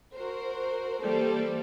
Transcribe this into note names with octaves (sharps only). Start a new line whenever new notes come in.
F#4 A#4 C5
E3 G3 A#3 A4 C5